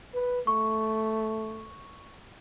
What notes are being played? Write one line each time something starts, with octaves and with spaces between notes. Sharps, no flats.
B4
A3 C#6